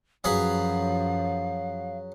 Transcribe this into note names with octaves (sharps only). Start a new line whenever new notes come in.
F#2 F3 F#3 G#4 B4 F5